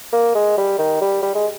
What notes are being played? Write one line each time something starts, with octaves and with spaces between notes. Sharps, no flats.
A#3
G#3
G3
D#3
G3
G3
G#3